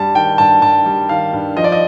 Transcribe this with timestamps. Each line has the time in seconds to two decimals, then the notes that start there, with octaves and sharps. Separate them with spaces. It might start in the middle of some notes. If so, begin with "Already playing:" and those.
Already playing: G2 G3 A5
0.15 D#3 G5
0.38 G2 A5
0.62 G2 A5
0.86 G3
1.09 D#3 F5
1.33 G2
1.57 F3 D#5
1.64 D5
1.72 D#5